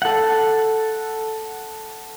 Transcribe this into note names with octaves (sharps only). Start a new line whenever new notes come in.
A4 F#5